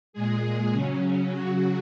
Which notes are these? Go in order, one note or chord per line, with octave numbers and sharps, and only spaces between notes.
A#2 G#3 G#4
C#3 F#3 C#4
C#3 F#3 F#4